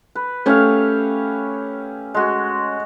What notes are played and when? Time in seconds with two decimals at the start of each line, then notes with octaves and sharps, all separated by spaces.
0.15 B4
0.46 A3 C#4 G4 C#5 F5
2.14 G#3 F#4